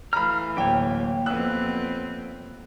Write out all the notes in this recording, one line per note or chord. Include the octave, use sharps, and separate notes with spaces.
E3 A3 F5 A#5 B5 F6
D1 A#3 G4 C#5 G5
F2 B3 C4 E6 F#6